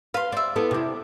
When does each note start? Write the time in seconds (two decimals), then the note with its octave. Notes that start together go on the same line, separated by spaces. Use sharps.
0.14 B4 F5 C6
0.32 C4 D5 E5
0.56 B3 E4 A4
0.71 C3 E4